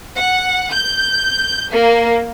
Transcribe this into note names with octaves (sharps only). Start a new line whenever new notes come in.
F#5
G6
A#3